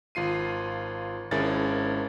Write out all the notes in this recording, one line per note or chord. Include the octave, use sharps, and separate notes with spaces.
G#1 F4 C7 D#7
G#1 G#3 C#4 E4 A#4 A6